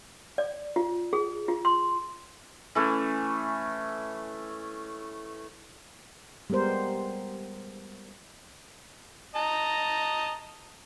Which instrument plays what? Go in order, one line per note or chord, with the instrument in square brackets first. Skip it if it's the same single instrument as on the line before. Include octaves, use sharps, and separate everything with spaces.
[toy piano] D5
F4
G#4
F4
C6
[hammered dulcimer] E3 A3 C#4
[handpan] G3 G#3 B3 A#4 C5
[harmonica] D#5 A5 A#5